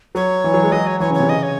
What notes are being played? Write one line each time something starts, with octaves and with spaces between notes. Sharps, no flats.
F#3 C#5
E3
F#3
G#3
F#3 D#5
C#5
E3 C#5
C#3
C#5
C3
C#3 D#5
C#5